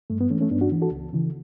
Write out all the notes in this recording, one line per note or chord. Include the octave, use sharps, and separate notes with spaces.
G2 A3
B3
E3 A3 C#4
A3 C#4
G2 B3 D4
D4 F#4
E3
F#4 A4
C#2
C#3 E3